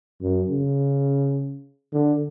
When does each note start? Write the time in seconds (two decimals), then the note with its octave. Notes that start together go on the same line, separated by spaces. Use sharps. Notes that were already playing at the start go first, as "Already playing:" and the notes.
0.22 F#2
0.50 C#3
1.93 D3